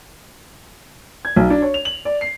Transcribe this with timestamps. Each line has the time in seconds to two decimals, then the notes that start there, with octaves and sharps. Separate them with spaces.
1.25 G#6
1.36 B1
1.50 D4
1.62 C#5
1.74 F7
1.85 F#7
2.05 D5
2.21 C7